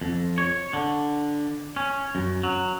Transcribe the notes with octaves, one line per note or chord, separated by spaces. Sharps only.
F2
C#5
D3
C#4
F#2
F#3